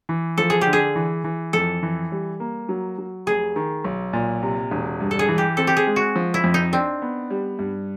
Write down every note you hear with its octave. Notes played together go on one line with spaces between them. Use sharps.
E3
F3 A4
G#4
G4
D3
G#4
E3
E3
F2 A4
E3
G3
A#3
F#3
F#3
F1 G#4
D#3
B1
A#2
C3
E1
G2
A4
G#4
E3
G4
C4 A4
G4
G#4
G#3
F#4
F3
E4
F2
D#4
C4 D4
B3
G3
G2